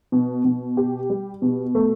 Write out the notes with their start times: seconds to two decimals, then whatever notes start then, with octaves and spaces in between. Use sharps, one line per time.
0.12 B2
0.45 B2
0.77 G4
1.10 G3
1.42 B2
1.75 A3